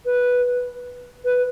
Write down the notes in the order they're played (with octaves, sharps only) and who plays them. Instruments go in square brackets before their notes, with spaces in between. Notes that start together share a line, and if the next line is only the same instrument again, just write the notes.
[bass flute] B4
B4